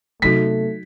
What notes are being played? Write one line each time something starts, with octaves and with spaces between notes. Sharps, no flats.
C3 F#3 A3 B3 D#4 F#4 B6